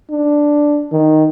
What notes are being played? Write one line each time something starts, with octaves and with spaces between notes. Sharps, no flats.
D4
D#3